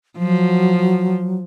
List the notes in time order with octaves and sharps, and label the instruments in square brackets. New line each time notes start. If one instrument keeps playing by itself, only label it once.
[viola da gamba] F3 [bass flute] F#3